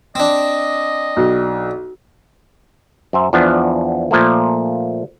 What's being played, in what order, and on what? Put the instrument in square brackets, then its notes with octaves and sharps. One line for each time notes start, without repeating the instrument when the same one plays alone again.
[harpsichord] C4 D4 [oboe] D#5
[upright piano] B1
[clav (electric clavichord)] F#2 C5 E5
E2 F3 B3 D4
A#2 F3 A3 A#3